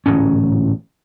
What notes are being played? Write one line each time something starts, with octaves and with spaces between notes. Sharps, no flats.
D1 A1 G#2 C#4